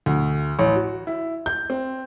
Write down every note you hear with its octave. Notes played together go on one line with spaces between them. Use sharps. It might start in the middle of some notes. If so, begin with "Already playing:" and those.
D2
A1
F#4
E4
G6
C4